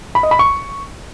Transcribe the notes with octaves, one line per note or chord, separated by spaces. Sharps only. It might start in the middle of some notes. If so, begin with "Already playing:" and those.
B5
D#5
B5
C#6